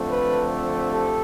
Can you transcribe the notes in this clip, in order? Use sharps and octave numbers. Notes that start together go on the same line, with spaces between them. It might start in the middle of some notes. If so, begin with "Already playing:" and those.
Already playing: D3 F3 A3 C4
A4 B4
G4 A4